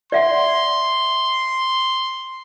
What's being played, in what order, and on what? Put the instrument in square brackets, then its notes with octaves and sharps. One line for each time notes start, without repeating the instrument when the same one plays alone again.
[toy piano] D5 E5 F#5 [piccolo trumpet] C6